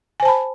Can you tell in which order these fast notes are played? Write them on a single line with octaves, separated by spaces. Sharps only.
G#5 C5 A5 B5